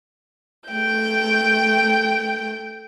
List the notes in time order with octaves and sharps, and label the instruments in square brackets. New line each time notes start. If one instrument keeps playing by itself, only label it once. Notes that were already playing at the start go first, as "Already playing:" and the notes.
[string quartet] A3 G5 G6